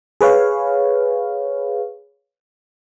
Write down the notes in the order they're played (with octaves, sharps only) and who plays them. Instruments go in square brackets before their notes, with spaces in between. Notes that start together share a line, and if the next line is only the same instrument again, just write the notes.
[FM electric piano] G#4 B4 C#5 F5